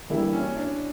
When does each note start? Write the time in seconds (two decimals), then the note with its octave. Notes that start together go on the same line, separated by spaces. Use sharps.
0.10 E3 G3 A#3 D4 E4
0.33 C#4
0.57 D4